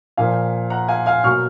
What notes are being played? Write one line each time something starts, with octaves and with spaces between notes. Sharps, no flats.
A#2 F3 A#3 F5 G#5
F#5 A#5
F5 G#5
F5 G#5
B2 F#3 A#3 C#6 F6